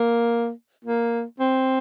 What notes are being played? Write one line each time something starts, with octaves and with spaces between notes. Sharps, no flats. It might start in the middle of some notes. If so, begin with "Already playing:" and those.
Already playing: A#3
A#3
C4